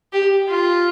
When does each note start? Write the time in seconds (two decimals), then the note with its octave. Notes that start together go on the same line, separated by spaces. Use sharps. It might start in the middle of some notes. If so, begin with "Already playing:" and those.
0.13 G4
0.48 F4